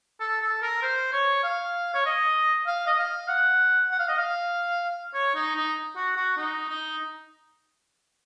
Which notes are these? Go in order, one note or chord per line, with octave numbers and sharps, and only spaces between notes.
A4
A4
A#4
C5
C#5
F5
C#5
D#5
F5
D#5
F5
F#5
F#5
F5
D#5
F5
C#5
D#4
D#4
F#4
F#4
D#4
D#4